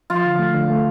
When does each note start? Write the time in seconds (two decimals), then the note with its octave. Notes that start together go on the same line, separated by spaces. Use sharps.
0.10 F3 F4
0.25 D3
0.39 A3
0.55 D3
0.70 A3